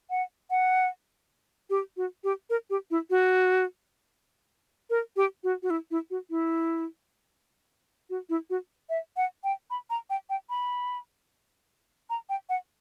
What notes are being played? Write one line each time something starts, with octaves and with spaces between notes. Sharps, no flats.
F#5
F#5
G4
F#4
G4
A#4
G4
E4
F#4
A#4
G4
F#4
F#4
E4
E4
F#4
E4
F#4
E4
F#4
E5
F#5
G5
B5
A#5
G5
G5
B5
A#5
G5
F#5